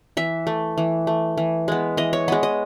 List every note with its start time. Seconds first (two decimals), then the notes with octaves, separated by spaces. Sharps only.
0.17 E3 E5
0.47 A3
0.78 E3
1.07 A3
1.37 E3
1.68 G#3 B3
1.97 E3 D#5
2.13 C#5
2.28 G#3 B3 D#5
2.43 D#5